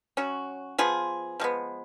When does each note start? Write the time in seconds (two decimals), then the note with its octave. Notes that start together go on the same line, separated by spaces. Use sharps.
0.17 F#3 C#4 F#4
0.78 F3 B3 F4 G#4
1.40 F3 G#3 B3